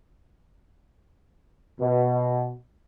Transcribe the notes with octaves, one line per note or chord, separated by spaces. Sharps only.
B2